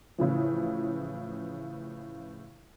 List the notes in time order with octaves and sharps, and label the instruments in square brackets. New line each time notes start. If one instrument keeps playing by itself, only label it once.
[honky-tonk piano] A2 C#3 E3 F3